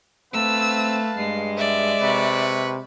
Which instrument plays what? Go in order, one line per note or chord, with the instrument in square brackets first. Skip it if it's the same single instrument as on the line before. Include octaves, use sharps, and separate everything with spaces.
[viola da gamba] A3 [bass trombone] C4 [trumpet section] B4 F5 A5 [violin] E6
[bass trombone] G2 [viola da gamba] G#3 [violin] C7
[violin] D5 E5
[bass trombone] C3 [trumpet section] B4 B5 C#6